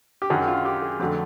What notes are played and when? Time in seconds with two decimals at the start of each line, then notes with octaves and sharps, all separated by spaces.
0.22 G4
0.30 F#2 D#3 F#3 G#4
0.48 F4
0.65 G4
0.82 G#4
0.99 F2 D3 F#3 A3